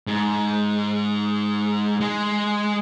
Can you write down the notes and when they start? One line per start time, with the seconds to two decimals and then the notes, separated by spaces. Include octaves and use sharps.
0.07 G#2
2.01 G#3